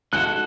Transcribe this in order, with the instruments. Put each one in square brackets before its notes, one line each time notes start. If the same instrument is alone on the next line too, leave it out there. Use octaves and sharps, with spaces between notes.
[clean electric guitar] G#3 D#4 F#4 A4 [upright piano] F#6